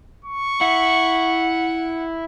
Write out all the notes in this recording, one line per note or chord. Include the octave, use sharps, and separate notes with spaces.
C#6
E4 F#5